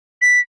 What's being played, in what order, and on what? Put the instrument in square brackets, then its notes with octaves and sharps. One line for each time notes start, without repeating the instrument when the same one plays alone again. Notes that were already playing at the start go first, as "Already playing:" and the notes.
[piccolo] B6